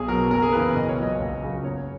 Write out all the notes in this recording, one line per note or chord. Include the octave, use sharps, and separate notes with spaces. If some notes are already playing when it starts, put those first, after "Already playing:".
Already playing: B1 G#4
B2 F#3 A#4
F#1 A#4
G#4
E2 C#3 E3 B4
B1 D#5
C#5
A#2 F#3 D#5
C#2
C#3 F#3
F#1 C#5